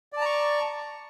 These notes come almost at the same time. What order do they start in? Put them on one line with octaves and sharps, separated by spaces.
D5 A5 A#5 C#6